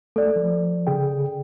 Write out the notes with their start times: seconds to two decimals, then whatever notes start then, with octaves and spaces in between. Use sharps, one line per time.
0.16 A3 A4 D5
0.36 F3
0.87 C#3 G#4 G5